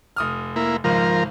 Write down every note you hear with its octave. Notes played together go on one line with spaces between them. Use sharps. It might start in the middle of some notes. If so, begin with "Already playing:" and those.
F1 D#6 F6
A#3 E4
G#1 C#2 F3 A#4